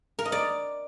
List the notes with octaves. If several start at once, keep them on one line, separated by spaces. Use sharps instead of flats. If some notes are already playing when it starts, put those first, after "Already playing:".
A#4
D#5
D5